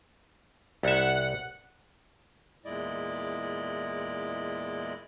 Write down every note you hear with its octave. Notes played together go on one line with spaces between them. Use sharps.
C2 E5 F#5
E2 A#2 G#3 E4 D5 D#5